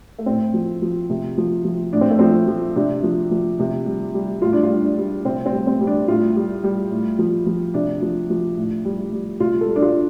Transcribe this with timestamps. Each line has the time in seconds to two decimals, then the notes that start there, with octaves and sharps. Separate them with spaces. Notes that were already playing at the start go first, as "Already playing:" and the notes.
0.18 A3
0.26 A2 C4
0.54 F3
0.82 F3
1.10 C3
1.38 F3
1.65 F3
1.93 A2 D4
2.01 C4
2.11 A3
2.19 F3 C4
2.48 F3
2.76 C3 D4
3.03 F3
3.31 F3
3.59 C3
3.86 G3
4.14 G3
4.42 A2 F4
4.53 D4
4.63 F4
4.69 G3
4.83 D4
4.98 G3
5.25 C3 C4
5.46 C4
5.52 G3
5.67 C4
5.81 G3
5.87 D4
6.08 A2 F4
6.36 G3
6.64 G3
6.91 A2
7.19 F3
7.46 F3
7.74 C3 D4
8.02 F3
8.30 F3
8.57 A2
8.85 G3
9.13 G3
9.40 C3 F4
9.61 A4
9.68 G3
9.76 D4
9.82 F4